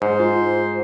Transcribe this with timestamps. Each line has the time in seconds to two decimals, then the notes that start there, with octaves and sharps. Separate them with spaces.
0.02 G#2 C5
0.20 F4